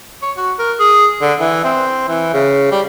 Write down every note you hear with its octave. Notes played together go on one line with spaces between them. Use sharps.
C#5
F#4
A#4
G#4
D3
E3
C4
E3
C#3
G3